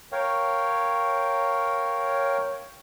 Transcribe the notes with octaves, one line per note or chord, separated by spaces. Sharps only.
A#4 C#5 F5 G5